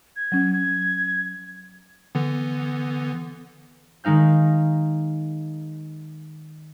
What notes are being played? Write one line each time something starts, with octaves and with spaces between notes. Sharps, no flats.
G#6
F#3 C#4
G#6
D3 E3 B3
D#3 G#3 D#4 F5 G6